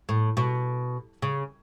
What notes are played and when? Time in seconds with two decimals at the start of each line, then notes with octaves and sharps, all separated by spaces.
0.09 A2
0.37 B2
1.22 C#3